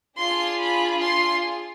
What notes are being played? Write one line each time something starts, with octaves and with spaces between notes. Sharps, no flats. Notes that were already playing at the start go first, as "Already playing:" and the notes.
D4 F4 G#4 C6
B5
C6